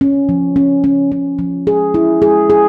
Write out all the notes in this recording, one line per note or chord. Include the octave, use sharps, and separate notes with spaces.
C#4
F3
C#4
C#4
C#4
F3
G#4
E4
G#4
G#4